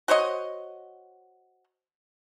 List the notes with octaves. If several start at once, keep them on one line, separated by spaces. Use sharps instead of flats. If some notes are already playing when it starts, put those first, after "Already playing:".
F#4 C5 C#5 D#5